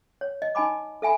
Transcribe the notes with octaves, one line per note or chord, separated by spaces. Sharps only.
C#5
D#5
D#4 D#5 G#5 B5 D6
A4 E5 G#5 B5